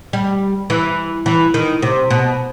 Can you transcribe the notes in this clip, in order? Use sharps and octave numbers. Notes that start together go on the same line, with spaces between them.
G3
E3
E3
D#3
C3
B2